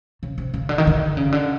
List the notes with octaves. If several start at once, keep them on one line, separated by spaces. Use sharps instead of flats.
C#3
C3
C#3
D3
D#3
D3
C#3
D3